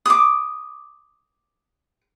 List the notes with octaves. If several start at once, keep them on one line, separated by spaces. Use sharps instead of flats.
D6 D#6